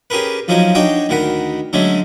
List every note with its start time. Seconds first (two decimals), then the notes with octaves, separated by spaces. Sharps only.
0.10 C#4 G4 G#4 A#4 B4
0.48 F#2 F3 C#4 D#4 G#5
0.75 D4 D#4 F#4 C#5 D#5 G5
1.09 D2 D#3 A#4 F#5 B5
1.73 D3 F#3 G#3 A3 C#4